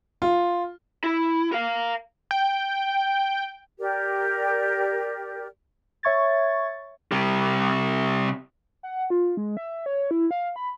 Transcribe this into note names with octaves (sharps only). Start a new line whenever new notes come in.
F4
E4
A#4 F5
G5
G4 A#4 D5
C#5 E5 C#6 G#6 A6
C3 G3
F#5
F4
G#3
E5
C#5
E4
F5
B5